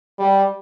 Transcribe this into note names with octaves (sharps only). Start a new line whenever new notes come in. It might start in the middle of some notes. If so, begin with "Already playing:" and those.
G3